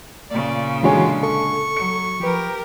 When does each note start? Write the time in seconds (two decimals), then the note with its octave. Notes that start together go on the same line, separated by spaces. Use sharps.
0.30 A#2 C#3 D5
0.83 D3 E3 G#3 F4 F#4 G#4 C#5
1.23 A4 C#6
1.77 F#3 C#7
2.20 F3 G4 A#4 B4